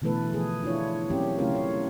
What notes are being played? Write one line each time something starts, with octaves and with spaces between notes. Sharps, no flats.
B2 D3 E3 A3 A4 B4
F3 G#4
D4 E4 F4 C#5
F#3 A#3 C4 C#4 G4
C#3 A3 C#4 E4 F4 A#4
C#5